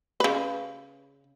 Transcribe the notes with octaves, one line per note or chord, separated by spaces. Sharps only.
C#3 B4